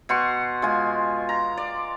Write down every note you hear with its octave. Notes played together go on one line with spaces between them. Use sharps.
B2 F#5 C6 C#6
G#3 F4 G#5
A#5
D5